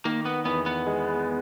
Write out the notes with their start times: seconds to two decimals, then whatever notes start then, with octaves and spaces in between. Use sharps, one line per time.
0.05 D#3 A#3
0.26 B3
0.45 E2 B3
0.66 B3
0.87 G#3